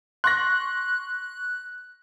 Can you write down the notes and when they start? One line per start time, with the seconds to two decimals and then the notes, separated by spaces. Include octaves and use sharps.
0.24 C6 C#6 F#6 A#6